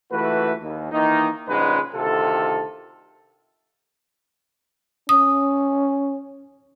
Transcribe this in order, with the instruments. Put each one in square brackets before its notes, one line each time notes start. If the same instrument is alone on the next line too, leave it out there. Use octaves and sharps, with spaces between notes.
[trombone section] C#2 E3 A3 F#4 B4
D#2
D#3 E3 A#3 D#4
A#1 G#2 C#3 G3 G#3 B4
D2 C3 D#3 F4 A4
[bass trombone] C#4 [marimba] D#6